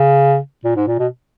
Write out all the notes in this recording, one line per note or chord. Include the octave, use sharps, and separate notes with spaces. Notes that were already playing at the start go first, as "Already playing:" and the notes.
Already playing: C#3
A#2
G#2
A#2
B2